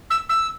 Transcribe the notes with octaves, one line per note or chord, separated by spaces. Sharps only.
E6
E6